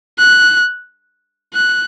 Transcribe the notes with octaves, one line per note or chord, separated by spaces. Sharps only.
F#6
F#6